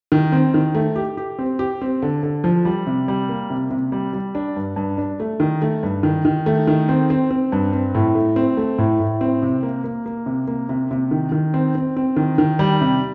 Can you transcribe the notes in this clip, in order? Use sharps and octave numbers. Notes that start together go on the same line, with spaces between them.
D#3
C4
D#3
A3
G4
G4
C4
G4
C4
D3
D3
F3
G3
C3
G3
A#3
C3
C3
G3
G3
D4
G2
G2
D4
A3
D#3
A3
G2
D#3
D#3
A3
D#3
C4
C4
C4
G2
C4
A2
A3
C4
A3
A2
A2
C4
C3
A#3
A#3
A#3
C3
A#3
C3
C3
D#3
D#3
C4
C4
C4
D#3
D#3
G3
C3